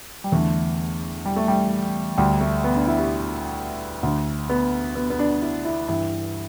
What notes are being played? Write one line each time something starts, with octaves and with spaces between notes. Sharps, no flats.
G3
E2 D3 A3
G3
A3
G3
D2 D3 G3
A3
B3
D4
E4
G4
D2 D3
B3
B3
B3
D4
E4
E4
G2 E3 E4